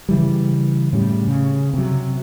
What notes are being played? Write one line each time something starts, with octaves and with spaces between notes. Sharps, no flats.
C#3 E3 G3
A2 C#3 G3
C#3
C3 F#3